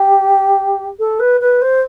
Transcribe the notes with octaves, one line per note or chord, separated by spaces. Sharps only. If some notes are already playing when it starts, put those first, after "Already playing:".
Already playing: G4
A4
B4
B4
C5